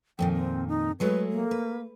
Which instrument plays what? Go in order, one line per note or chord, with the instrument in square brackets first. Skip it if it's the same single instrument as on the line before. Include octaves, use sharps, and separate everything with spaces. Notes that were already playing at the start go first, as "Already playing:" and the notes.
[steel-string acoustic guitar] F2 A#2 D#3 [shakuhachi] G5
[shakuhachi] C4
D#4
[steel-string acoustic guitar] F#3 G#3 A3 [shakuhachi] B4
[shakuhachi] A#3
[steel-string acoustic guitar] B4